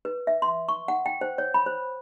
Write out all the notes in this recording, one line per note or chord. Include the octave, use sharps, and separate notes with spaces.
B4
E5
C6
C#6
F#5
G5
C5
C#5
B5
C5